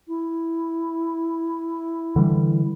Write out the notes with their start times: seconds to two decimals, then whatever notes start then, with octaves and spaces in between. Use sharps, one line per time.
0.08 E4
2.16 D3 E3 G3